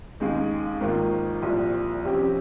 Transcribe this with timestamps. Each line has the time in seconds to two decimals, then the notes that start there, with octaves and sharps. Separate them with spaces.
0.20 D#2 C#3 G#3 D#4 G#4
0.81 G#1 G#2 D#3 A#3 F4
1.42 C2 A#2 F3
2.04 F2 C3 G3 C#4 G4